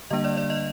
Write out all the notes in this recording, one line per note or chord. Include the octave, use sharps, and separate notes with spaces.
D3 G3 A#3 D4 D#5
D5
D5
D#5